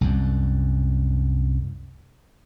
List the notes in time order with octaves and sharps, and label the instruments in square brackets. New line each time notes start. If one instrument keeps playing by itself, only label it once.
[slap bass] C2 F#2